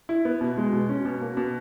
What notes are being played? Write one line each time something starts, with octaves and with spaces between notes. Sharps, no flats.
E4
B3
B2
G#3
B2
C#4
B2
A#3
B2